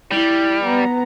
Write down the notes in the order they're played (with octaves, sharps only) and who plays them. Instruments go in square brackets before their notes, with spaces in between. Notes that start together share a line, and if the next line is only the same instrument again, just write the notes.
[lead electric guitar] G3 [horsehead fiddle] E4
[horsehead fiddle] B3 A#5